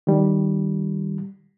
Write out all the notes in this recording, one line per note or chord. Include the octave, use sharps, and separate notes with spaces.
D#3 G3